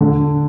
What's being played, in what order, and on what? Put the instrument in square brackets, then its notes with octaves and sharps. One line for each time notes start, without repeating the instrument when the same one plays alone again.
[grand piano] D3